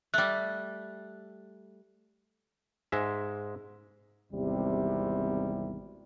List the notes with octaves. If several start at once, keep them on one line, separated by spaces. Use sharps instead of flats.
G3 A3 F#6
G#2 G#3 E5
G#1 E2 C3 G3